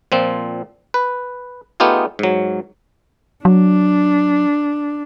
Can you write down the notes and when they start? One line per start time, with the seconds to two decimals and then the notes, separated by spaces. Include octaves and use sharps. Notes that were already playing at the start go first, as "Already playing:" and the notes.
0.12 A#2 F3 C4
0.94 B4
1.80 A3 B3 D#4 F4 G4 G#4
2.19 G#2 F#3
3.45 F#3 D4